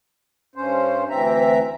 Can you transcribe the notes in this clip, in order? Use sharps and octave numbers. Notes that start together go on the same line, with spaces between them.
G2 C#4 C5
D2 E3 C4 E5 A#5